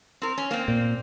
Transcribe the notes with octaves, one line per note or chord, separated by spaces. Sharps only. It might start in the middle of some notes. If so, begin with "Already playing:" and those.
C4 A#4
C#4
A#3 C4
A#2